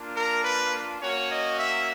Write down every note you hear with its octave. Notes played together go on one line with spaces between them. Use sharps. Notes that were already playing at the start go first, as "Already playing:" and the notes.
Already playing: A#3 D4 F4
A#4
B4
A#3 C#4 F#4 C#5
D#5
E5